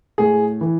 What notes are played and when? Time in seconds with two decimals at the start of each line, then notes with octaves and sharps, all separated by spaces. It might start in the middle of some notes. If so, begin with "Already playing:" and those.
0.18 A2 G#4
0.61 E3